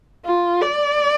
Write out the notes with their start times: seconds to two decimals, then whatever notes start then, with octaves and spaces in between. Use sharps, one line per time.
0.25 F4
0.61 D5